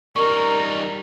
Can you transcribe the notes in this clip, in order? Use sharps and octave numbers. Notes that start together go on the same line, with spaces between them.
G3 D#4 A#4 C#6